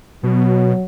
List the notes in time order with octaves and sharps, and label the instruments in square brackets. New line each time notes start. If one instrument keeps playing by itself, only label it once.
[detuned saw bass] B2 [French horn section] F#3